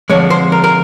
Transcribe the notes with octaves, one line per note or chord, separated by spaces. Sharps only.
F2 D3 F3 G#3 C#5
C5
A#4
A#4